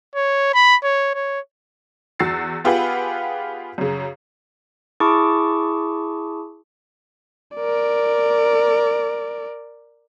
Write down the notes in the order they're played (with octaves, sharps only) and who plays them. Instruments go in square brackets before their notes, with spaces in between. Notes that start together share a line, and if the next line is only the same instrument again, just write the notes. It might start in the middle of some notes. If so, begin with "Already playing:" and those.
[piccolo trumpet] C#5
B5
C#5
C#5
[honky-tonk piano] E2 F#4 E6 A6 C7
B3 F4 G4 G#4 B4 F#5
F#2 C#3
[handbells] E4 G#4 A5 C#6 D6
[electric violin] A#4 D5